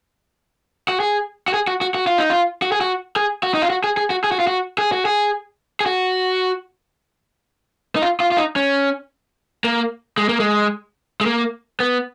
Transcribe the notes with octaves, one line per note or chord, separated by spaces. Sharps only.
F#4
G#4
F#4
G#4
F#4
F#4
F#4
F4
D#4
F4
F#4
G#4
F#4
G#4
F#4
D#4
F4
F#4
G#4
G#4
F#4
G#4
F#4
F4
F#4
G#4
F#4
G#4
G#4
F#4
D#4
F4
F4
F4
D#4
C#4
A#3
G#3
A#3
G#3
G#3
A#3
B3